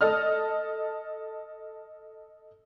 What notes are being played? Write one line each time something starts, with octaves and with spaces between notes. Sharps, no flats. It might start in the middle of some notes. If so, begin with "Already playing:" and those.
A4 D#5 F6